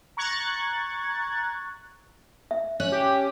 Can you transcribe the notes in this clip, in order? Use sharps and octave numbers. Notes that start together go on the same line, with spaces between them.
A#5 C#6 F#6 G#6 A6
E5
C#4 F#6
G4